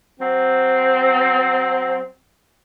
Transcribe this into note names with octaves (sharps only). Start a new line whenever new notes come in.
F#3 C4